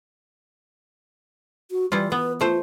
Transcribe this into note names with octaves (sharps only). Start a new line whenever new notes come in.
F#4
E3 G3 E4 F4
B3 B4
A3 F4 C5